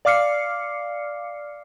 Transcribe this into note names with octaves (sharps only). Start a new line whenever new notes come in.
D5 F5 D6 F6 C7 C#7